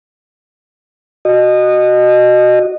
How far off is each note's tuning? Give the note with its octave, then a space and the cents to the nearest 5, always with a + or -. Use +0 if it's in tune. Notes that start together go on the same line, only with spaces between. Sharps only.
F#4 +0 D#5 -20